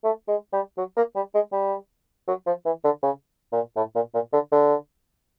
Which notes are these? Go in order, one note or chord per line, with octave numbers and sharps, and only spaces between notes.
A3
G#3
G3
F#3
A#3
G3
G#3
G3
F#3
F3
E3
D3
C#3
A#2
A2
A#2
A#2
D3
D3